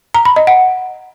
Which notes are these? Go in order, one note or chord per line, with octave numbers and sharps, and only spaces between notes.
A#5
B5
D#5
F#5